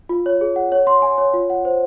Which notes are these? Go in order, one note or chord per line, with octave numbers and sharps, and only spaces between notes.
F4
C#5
G#4
F#5
C#5
C6
G#5
C#5
F4
F#5
C5